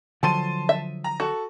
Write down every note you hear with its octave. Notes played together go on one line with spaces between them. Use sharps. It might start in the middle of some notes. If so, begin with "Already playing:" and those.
D3 F3 F#3 A5 C6 D#7
E5
A#5
F#4 A4